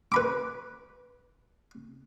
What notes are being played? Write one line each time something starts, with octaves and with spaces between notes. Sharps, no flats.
B4 B5 D6